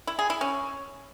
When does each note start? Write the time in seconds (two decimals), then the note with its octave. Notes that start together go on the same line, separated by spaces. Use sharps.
0.07 E4
0.19 G#4
0.30 E4
0.41 C#4